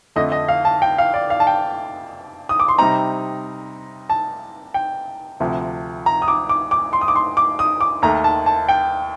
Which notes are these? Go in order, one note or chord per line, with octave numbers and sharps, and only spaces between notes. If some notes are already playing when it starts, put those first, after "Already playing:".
F2 D3 A3 D#5
D#5
F5
A5
G5
F5
D5
F5
A5
G5
D#6
D6
C6
C3 G3 C4 D#4 A#5
A5
G5
D2 C3 F3
A#5
D#6
D6
D6
D6
C6
D#6
D6
C6
D6
D#6
D6
D#2 D#3 A3 A#5
A5
A5
G5